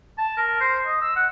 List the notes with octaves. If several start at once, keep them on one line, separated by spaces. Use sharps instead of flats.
A5
A#4
C5
D#5
E6
F#5